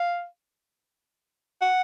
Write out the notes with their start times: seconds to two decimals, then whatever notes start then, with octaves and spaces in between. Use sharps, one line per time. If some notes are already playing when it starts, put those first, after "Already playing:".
Already playing: F5
1.62 F#5